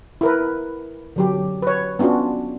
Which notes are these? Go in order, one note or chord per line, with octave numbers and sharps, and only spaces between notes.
E4 A#4 B4
D3 F#3 G4
B4 C#5
B3 C#4 D4 F4 F#4